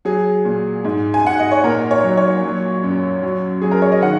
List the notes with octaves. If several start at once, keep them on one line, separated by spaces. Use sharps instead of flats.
F#3 G#4
A#2
G#2
G#5
G#2 F#5
D#5
C#5
A#2 A#4
C#5
F#3
C#5
F#3
F#2
F#3
F#3 G#4
A#4
C#5
D#5
D#3 F#5